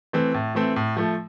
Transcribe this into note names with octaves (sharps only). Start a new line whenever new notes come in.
E3 A3 C4
A2
E3 A3 C4
A2
F3 A3